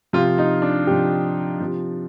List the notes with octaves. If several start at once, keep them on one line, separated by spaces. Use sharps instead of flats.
C3 F3 F4
D#4
D4
C3 F3 G4
C3 F3